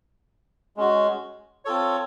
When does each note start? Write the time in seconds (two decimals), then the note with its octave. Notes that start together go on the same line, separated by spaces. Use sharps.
0.77 G#3 C#4 F#4
1.65 C4 F4 A4 C#5